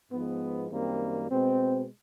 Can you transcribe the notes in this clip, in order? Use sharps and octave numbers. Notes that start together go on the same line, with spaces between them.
G#2 F3 G#3 B3
F#2 D#3 G3 A#3 C4
B2 G#3 C4